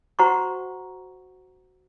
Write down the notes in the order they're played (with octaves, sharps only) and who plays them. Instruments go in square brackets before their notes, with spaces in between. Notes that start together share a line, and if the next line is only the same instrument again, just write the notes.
[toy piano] F#4 C5 F#5 A#5 C#6